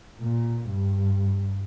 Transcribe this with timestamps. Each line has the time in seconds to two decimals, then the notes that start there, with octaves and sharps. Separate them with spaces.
0.21 A#2
0.70 G2